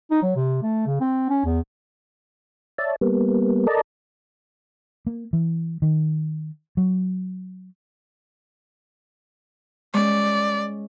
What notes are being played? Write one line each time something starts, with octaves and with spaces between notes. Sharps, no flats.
D#4
F#3
C3
A3
C#3
C4
C#4
E2
C#5 D5 E5 A5
G3 A#3 B3
A4 A#4 D5 D#5 A5 A#5
A#3
E3
D#3
F#3
G#3 C#4 D5